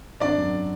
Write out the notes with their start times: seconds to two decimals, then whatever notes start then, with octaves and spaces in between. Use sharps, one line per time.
0.20 G#1 D4 D5
0.38 F#2